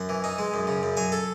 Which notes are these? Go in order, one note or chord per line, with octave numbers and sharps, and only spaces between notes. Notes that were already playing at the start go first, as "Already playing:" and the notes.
Already playing: F#2 F#5
E3
D#4
G#3
F#2
C#3
F#2
F#3 G#5
A4